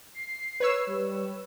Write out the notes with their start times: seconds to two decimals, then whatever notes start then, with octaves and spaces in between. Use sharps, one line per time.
0.14 C7
0.60 B4 C#5 E6
0.87 G3